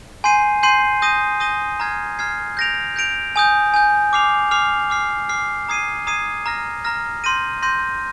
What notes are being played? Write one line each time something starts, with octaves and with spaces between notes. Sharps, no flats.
G#5 C6 G6 C7 D#7
G#5 C6 G6 C7 D#7
D#6 G6 A#6 D#7 G7
D#6 G6 A#6 D#7 G7
A#5 F6 G#6 C7
A#5 F6 G#6 C7
G6 A#6 D7 F7
G6 A#6 D7 F7
G#5 D#6 G6
G#5 D#6 G6
D6 F6 C7 F7
D6 F6 C7 F7
D6 F6 C7
D6 F6 C7
A#5 D#6 G#6 C7 D#7
A#5 D#6 G#6 C7 D#7
A#5 F6 A#6
A#5 F6 A#6
C6 G6 A#6 D#7
C6 G6 A#6 D#7